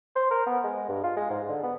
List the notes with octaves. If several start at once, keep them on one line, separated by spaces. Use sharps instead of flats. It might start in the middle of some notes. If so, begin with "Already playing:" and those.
C5
A#4
B3
G#3
G2
F4
G#3
G#2
D3
B3